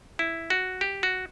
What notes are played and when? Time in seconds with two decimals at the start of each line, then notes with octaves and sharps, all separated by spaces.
0.19 E4
0.50 F#4
0.81 G4
1.03 F#4